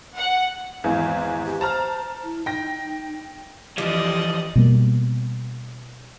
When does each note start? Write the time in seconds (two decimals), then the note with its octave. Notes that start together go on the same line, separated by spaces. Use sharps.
0.17 F#5
0.84 G#1 E2 F5
1.46 G4
1.61 C5 A5 A#5 F6
2.24 E4
2.46 D#4 G5 A#6
3.78 F2 E3 F3 G3 G4 D5 D#5
4.56 B2 G3 A#3